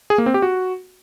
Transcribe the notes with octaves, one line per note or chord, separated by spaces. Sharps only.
G#4
A#3
C4
G4
F#4